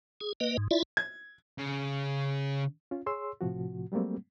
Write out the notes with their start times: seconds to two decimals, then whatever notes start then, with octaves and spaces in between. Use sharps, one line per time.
0.21 G#4
0.40 A#3 B4 D#5
0.57 G#2
0.71 E4 F4 D5 E5
0.97 G#6
1.58 C#3
2.91 C#4 F4
3.06 G#4 C#5 C6 E6
3.41 A2 C3 F3 F#4
3.92 F#3 G3 A3 A#3 C4